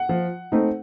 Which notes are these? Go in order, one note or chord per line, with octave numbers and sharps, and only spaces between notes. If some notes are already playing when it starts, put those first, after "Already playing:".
Already playing: F#5
F3
A3 C4 D#4